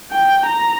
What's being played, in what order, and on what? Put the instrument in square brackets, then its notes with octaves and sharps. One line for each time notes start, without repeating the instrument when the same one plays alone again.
[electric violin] G5
A#5